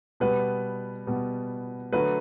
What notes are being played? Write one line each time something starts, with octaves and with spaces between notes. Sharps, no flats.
B2 G3 B3 B4
B2 G3 B3
D3 F#3 A3 B4